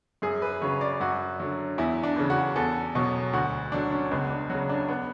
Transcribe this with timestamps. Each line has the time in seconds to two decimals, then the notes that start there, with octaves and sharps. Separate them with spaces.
0.22 F#2 G#4
0.42 B4
0.62 C#3 F#3 C#5
0.81 D5
1.00 F#2 F#4
1.40 D3 F#3
1.78 E2 E4
2.03 D4
2.16 C#3 E3
2.30 F#4
2.56 E2 A4
2.95 B2 F#3
3.33 D2 F#4
3.72 D3 F#3 D4
3.92 C#4
4.11 C#2 B3
4.30 D4
4.50 C#3 F#3 F#4
4.69 D4
4.89 B3